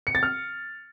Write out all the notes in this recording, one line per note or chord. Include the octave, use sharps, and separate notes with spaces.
C#7
A6
F6